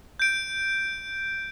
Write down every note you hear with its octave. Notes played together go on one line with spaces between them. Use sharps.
G6 D7